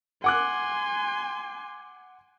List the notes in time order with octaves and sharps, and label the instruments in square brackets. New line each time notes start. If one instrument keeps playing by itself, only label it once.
[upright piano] F#5 D6 F#6 [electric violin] G#5 C6